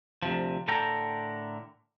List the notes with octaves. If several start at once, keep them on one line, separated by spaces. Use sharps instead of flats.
D2 C3 F3
A2 D3 A4 A#4 G5 A#5